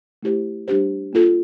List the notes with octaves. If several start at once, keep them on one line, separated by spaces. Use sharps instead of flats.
A3 E4 G4 C5
G3 D4 G4 C5
A#3 F4 A4